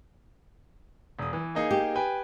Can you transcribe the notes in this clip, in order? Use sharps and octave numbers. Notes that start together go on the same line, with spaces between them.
E1 D#6
E3
A#3 D#4 G#4
G4
B4 G5 G#5